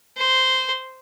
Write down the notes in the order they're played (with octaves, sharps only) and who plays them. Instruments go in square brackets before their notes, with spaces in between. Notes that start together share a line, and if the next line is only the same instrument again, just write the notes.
[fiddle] C5